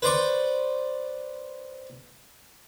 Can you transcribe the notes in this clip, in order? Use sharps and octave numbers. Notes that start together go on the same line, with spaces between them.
B4 C5 D5 C#6